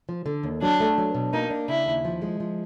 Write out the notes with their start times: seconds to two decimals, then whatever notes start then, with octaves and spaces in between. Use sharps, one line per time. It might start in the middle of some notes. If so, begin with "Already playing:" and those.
0.09 F3
0.26 D3
0.43 D#2
0.62 F#3 D4
0.80 A3
0.98 F#3
1.15 B2
1.33 A#3 D#4
1.50 D4
1.68 C#3 E4
1.86 D#2
2.05 F3
2.22 G#3
2.40 F3